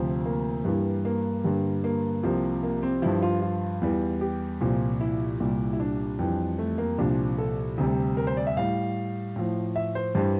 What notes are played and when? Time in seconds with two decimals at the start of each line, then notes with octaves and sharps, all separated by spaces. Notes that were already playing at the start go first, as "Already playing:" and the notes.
Already playing: D2 C3 F3
0.26 A#3
0.65 G2 E3 G3
1.05 A#3
1.44 G2 D3 G3
1.84 A#3
2.24 C2 C3 F3
2.63 A#3
2.83 C4
3.02 G2 F3 E4
3.22 F4
3.42 F4
3.82 E2 E3 G3
4.21 G4
4.61 C2 A#2 F3
5.01 E4
5.40 C2 A#2 G3
5.73 E4
5.80 D4
6.19 F2 E3 G3
6.59 A3
6.78 A#3
6.98 C2 A#2 F3 D4
7.38 A4
7.77 D2 C3 G3
8.17 A#4
8.27 C5
8.37 D5
8.47 E5
8.57 A2 G3 F5
9.36 A2 F3
9.76 E5
9.95 C5
10.15 G2 E3 G3 C5